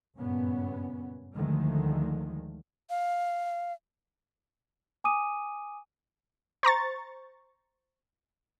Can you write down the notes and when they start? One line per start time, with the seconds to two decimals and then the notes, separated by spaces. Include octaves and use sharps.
0.17 F#1 G2 A#2 B3 C#4
1.35 D2 D3 D#3 F3 G#3 A3
2.90 F5
5.04 G#5 D6 D#6 D#7
6.63 C5 A#5 C#6 A6